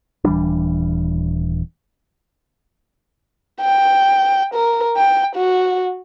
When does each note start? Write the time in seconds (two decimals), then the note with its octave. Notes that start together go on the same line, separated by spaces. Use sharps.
0.24 D#1 E3 G3 D4
3.61 G5
4.54 A#4
4.97 G5
5.36 F#4